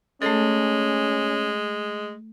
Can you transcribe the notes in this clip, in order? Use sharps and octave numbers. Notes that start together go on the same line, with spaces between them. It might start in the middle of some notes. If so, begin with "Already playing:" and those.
G#3 A3 C#4 A4